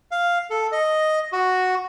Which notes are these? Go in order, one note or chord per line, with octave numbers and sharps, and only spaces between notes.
F5
A4
D#5
F#4